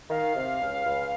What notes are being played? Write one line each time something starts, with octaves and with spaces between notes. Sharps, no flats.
D#3 F5
C3
C#2
C#2